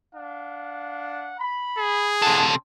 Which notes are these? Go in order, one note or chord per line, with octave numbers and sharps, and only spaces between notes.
D4 F5 F#5
B5
G#4
C3 E4 A4 F#5 A5